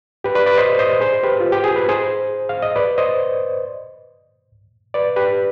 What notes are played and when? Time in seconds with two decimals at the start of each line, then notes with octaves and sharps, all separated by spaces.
0.24 G4 B4
0.35 B4 D5
0.46 B4 D5
0.58 C5 D#5
0.79 C5 D#5
1.01 G#4 C5
1.23 G4 B4
1.40 F4
1.52 G4
1.64 G#4
1.76 B4
1.89 G#4 C5
2.49 F5
2.63 D#5
2.76 B4 D5
2.98 C5 D#5
4.94 B4 D5
5.16 G4 B4